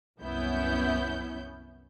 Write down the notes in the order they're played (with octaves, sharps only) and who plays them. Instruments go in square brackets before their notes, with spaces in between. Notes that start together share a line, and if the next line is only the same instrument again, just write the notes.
[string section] C2 F#2 B3 C#4 E4 G6